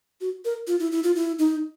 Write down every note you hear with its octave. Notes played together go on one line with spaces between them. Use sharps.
F#4
A#4
F4
E4
E4
F4
E4
D#4